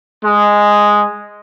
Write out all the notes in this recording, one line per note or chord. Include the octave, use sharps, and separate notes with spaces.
G#3